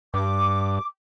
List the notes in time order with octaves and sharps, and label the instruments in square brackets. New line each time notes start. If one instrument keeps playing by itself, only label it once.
[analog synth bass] G2 [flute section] D6